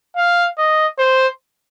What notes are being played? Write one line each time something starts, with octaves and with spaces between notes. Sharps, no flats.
F5
D#5
C5